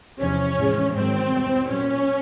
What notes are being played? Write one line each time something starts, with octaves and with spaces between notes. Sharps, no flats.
E2 C3 F3 C#4
A2 E3 G#3
G#2 D#3 F#3 C4
E2 B2 G3
A#2 F#3 C#4